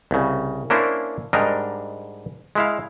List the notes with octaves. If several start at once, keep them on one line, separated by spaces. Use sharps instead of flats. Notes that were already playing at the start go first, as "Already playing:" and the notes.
C2 C#3
A#3 C#4 D4 E4 A#4 C5
G#2 G3 D4 A#4 D#5 A#5
G#3 E4 F5